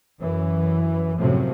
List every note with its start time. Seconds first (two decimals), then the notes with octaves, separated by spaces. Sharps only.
0.20 F#2 E3
1.18 F#2 A2 C3 F3 F#3